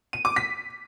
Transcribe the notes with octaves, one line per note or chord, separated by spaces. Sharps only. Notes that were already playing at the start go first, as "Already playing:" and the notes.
D#7
D6
B6